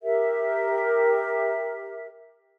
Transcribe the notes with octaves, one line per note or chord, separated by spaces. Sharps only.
G4 A#4 E5